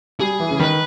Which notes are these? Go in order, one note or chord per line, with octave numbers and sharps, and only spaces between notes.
G3 G#4
E3
C#3
D#3 B4